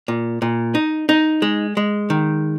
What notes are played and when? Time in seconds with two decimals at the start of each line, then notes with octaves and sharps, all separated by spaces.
0.08 A#2
0.42 A#2
0.75 D#4
1.09 D#4
1.42 G#3
1.77 G#3
2.10 D#3